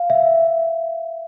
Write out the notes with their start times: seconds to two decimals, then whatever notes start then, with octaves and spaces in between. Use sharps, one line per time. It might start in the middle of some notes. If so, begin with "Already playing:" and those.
Already playing: F5
0.10 E5